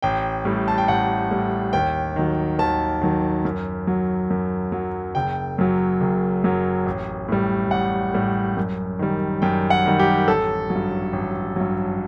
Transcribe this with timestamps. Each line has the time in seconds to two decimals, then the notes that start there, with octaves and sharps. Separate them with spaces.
0.02 A1 G5
0.45 A2 G3
0.68 A5
0.78 G5
0.88 A1 F#5
1.31 A2 G3
1.73 D#2 G5
2.16 D#3 F#3
2.59 D#2 A5
3.01 D#3 F#3
3.45 F#2
3.87 F#3
4.30 F#2
4.72 F#3
5.15 F#1 G5
5.58 F#2 F#3
6.01 F#1
6.44 F#2 F#3
6.86 A1
7.28 A2 G3
7.71 A1 F#5
8.14 A2 G3
8.57 F#2
8.99 D#3 G3
9.42 F#2 G5
9.70 F#5
9.86 D#3 G3
9.99 G4
10.27 A1 A4
10.70 F#3
10.75 G2
11.13 A1
11.56 G2 F#3